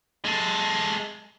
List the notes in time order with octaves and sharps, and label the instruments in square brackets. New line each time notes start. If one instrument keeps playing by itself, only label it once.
[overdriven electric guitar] G#3 A4